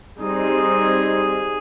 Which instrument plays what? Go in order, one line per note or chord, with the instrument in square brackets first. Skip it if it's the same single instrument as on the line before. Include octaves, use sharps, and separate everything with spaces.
[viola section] G3 C4 D#4 [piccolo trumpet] G#4